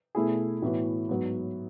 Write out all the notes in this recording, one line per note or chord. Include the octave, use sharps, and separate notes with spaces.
B2 A3 E4 G#4
A2 E3 B3 F#4
G#2 F#3 B3